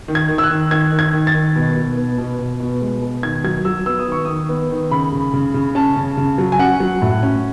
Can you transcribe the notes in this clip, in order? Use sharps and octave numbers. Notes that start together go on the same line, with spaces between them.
D#3
G#6
D#3
E6
F#6
D#3
D#3 G#6
D#3
G#6
D#3
A6
D#3
B2
B2
B3
B2
B2
B2
G#3
B2
D#3 G#6
F#3 G#6
F#3 E6
B3 E6
D#6
D#3 C#6
D#3 D#6
B3
D#3
C#3 B5
C#3
C#3
C#3
C#4 A5
C#3
C#3
F#3
G#5
C#4 F#5
F#3
A2
C#4